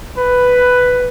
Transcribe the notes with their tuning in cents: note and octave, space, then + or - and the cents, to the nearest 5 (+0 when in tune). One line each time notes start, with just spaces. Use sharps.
B4 +5